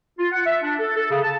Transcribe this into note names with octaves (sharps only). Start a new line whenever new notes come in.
F4
F#5
E5
D4
A4
A4
C#3
A5